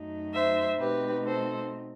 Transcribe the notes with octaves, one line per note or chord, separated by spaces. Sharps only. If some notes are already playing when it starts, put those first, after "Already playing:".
Already playing: F#2 F#3 A3 D#4
C5 E5
B2 A3 C4 D#4 G4 B4
A4 C5